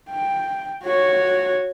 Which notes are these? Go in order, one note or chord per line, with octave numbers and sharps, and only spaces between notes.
G5
F#4 C#5